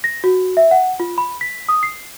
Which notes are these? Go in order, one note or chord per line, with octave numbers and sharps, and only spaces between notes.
A#6
F#4
E5
F#5
F4
B5
B6
D#6
C7